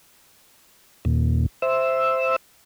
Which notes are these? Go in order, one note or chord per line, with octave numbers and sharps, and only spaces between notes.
D#2 A#2
C5 E5 E6